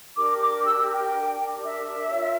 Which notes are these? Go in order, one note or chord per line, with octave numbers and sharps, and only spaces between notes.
D4 G4 A#4 D6
D6
E6
G5
D4 G4 A#4
E5
F4 A#4 C#5